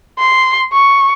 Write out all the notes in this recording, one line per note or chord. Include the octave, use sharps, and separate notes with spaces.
C6
C#6